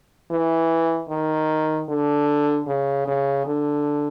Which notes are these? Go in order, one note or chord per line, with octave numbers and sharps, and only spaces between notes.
E3
D#3
D3
C#3
C#3
D3